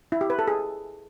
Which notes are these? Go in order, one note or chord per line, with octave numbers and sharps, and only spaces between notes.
E4
G4
B4
A4
G#4